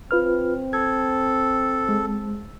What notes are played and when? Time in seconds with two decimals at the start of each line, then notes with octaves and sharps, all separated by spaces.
0.11 C4 F4 B4 F6
0.73 A4 G#6
1.89 G#3